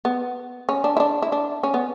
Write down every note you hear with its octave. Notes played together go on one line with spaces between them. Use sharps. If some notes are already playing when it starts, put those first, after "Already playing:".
B3
C#4
D4
E4
D4
E4
D4
C#4
B3